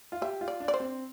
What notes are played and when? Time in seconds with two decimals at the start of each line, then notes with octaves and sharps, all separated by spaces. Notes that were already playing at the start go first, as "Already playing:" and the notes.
0.12 F4
0.22 G4 E5
0.41 F4
0.48 D5
0.60 D4
0.68 D5
0.74 C5
0.80 C4